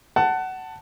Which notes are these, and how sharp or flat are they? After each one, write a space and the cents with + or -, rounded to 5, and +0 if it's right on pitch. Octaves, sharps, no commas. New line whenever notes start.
F#5 +20 A5 +10